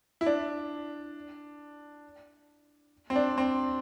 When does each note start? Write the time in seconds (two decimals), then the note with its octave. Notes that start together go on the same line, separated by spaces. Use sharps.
0.21 E4
0.26 D4
3.10 C4
3.15 D4
3.38 C4